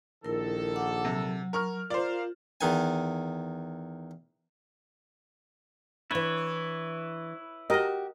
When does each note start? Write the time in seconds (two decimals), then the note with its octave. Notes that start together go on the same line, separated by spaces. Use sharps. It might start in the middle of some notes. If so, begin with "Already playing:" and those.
0.25 A#1 D#3 E4 A4 A#4
0.76 F#5 D6
1.05 C3 F#3
1.53 A#4 C#6 F6
1.90 F4 A#4 C5 D5 F5
2.61 E2 D#3 G#5
6.11 E3 D4 E4 B4 C#5
7.70 F#4 G4 A#4 D#5